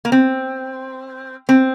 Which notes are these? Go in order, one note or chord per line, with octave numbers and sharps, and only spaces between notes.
A#3
C4
C4